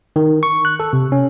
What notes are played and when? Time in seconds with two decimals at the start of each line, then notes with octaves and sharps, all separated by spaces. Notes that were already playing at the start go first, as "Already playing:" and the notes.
0.16 D#3
0.43 C#6
0.65 F#6
0.80 A4
0.93 C3
1.12 C#4